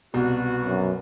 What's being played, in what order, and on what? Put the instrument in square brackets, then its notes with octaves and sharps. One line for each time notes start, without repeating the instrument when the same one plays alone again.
[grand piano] C2 [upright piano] B2 [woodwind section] F#4
[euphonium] F#2